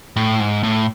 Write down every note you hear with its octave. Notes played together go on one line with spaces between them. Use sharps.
A2
G#2
A2